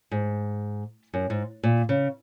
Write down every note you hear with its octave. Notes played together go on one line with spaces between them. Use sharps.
G#2
F#2
G#2
A#2
C#3